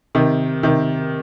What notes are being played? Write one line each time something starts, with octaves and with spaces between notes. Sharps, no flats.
C3 D#3
C3 D#3